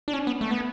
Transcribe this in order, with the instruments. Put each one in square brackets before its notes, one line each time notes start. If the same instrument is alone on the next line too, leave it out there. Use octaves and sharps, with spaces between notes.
[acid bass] D4
C#4
B3
A3
B3